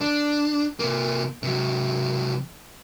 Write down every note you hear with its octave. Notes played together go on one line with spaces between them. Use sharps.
D4
C3 A#3
C3 F#3